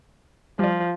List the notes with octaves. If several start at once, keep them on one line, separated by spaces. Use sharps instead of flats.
F3 G3 D5